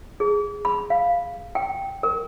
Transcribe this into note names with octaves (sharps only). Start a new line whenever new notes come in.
G#4
B5
F5
G5
A#4